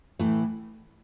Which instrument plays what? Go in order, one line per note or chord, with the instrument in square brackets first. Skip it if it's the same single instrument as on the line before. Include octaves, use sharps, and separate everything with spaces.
[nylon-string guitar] A2 E3 A3